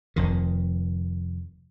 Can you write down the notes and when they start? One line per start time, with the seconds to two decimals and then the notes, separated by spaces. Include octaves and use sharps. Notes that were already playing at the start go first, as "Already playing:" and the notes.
0.16 F1 F2 D#3